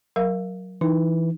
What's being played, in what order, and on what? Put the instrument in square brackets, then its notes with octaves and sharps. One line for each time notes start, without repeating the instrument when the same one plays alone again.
[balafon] F#3 A#4 F5
[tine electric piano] E3 [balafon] D#4